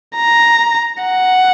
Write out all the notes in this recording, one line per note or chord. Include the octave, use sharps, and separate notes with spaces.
A#5
F#5